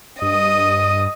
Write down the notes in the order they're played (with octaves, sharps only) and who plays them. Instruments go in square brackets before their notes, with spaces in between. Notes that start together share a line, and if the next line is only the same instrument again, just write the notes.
[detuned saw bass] G2 [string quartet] D#5 [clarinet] D#6